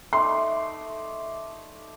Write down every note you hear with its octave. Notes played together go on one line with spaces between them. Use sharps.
A3 D#4 D5 C6